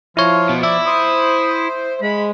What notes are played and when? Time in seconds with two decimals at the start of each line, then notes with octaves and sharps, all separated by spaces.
0.17 F3 E4 F4 C#5
0.49 B2
0.63 E4 D5 E5
0.86 C5 D#6
2.02 G#3 B5